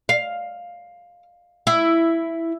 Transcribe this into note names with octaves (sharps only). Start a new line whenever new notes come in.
F5
E4